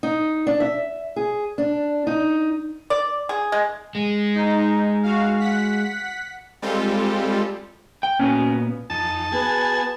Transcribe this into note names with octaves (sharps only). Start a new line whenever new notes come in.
D#4
D4
E5
G#4
D4
D#4
D5
G#4
G#3
G#3
D#4
F#4 F5
F#5 B6
G3 G#3 C4 F4 G4 A4
G5
A#2 B3 C#4 F#4
F2 D#4 A5
B3 F#4 G#4 G#5